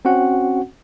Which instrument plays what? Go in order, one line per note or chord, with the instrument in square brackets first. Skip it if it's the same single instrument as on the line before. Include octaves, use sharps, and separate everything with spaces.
[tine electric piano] C4 C#4 F#4 F#5